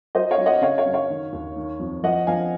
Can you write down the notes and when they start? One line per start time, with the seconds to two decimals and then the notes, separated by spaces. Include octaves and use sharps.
0.15 F#3 C5 D#5
0.31 C#5 F5
0.38 F#3
0.46 D#5 F#5
0.62 C#3 C#5 F5
0.78 C#5 F5
0.86 F#2
0.93 C#5 F5
1.10 D#3
1.33 D#2
1.56 D#3
1.80 F2
2.04 F3 D#5 F#5
2.27 F3 F5 G#5